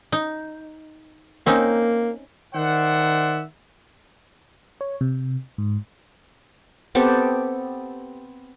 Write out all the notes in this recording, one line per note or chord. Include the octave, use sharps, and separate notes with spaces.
D#4
A#3 C4 C#4 D#4
D#3 C5 D5 E5 F#5
C#5
C3
G#2
B3 C4 G4 A4